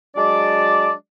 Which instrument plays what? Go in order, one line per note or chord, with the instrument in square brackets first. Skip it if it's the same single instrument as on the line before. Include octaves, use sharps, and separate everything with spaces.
[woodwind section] F#3 G#3 D4 D5